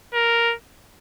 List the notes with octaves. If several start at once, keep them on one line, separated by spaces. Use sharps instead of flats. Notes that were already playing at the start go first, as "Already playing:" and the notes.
A#4